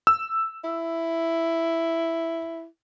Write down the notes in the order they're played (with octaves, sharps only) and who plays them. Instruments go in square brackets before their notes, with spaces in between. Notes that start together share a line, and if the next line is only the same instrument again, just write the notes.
[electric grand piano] E6
[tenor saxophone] E4